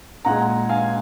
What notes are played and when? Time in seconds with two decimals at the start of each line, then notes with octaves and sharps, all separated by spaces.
0.25 A#2 G#3 F#5 A#5
0.69 F5 G#5